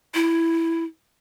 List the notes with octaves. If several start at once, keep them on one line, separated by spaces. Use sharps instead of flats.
E4